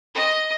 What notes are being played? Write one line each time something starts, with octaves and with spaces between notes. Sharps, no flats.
D#5